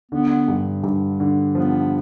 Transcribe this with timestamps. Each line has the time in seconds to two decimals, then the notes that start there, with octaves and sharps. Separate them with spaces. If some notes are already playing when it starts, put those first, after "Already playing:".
0.11 D3 B3
0.48 G2
0.83 G2
1.20 D3
1.55 F3 B3